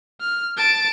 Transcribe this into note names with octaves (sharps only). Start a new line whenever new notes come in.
F6
A5 D7